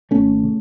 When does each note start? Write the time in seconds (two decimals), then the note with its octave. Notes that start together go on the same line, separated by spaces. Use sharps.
0.11 G#1 A3 C#4
0.43 C#3